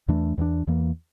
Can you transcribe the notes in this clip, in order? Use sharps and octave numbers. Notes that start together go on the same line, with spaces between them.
E2 E3 A3 D4
E2 E3 A3 D4
E2 E3 A#3